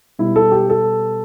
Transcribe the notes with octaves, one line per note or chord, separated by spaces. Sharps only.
B2 G3 E4
A4
G4
A4